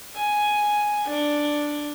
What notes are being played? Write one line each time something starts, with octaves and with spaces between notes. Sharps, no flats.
G#5
D4